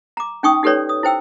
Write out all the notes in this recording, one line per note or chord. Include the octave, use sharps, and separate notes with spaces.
A#5 D6
C#4 D#4 G5 C#6 D#6
D#4 G4 A4 B4 C#5 D5
D#6
E4 C5 G5 E6